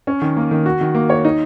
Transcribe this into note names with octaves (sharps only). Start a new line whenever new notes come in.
C#4
D#3
A#3
D#3
F#4
D#3
A#3
C#5
D#4